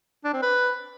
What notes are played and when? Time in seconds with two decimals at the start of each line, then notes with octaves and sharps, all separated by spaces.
0.24 D4
0.33 C4
0.42 B4